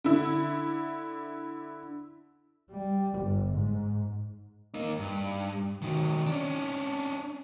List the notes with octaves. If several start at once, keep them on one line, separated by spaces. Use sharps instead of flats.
D3 E4
G3
G1
G#2
A#3 D#4
G2
D#3 F#3
C#4 D4